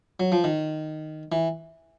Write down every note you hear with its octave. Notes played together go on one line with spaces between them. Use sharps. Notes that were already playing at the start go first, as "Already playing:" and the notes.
F#3
F3
D#3
E3